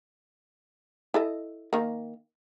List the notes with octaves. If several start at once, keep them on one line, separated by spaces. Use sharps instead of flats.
E4 A4 D#5
D#3 A#3